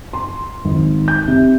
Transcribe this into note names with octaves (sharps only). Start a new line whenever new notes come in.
C6
G#1
G6
C3